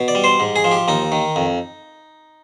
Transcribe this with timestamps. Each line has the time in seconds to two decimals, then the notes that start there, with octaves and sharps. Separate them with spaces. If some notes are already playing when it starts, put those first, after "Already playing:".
Already playing: B2
0.08 D5
0.15 G3
0.24 C5
0.40 G#2
0.56 G#4
0.64 F3
0.72 G4
0.88 D#2 D#4
1.12 D#3
1.36 F2